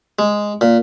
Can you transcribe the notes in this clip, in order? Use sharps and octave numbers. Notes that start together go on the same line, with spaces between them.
G#3
A#2